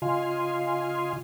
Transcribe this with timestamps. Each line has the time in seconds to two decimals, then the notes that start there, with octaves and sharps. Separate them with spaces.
0.02 C#3 F4 D#5 F5 G#5 C6